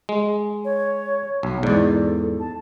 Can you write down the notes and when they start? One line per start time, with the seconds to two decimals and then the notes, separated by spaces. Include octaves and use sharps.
0.09 G#3
0.65 C#5
1.43 B1
1.63 E2 G#2 D5
1.91 A4
2.40 A5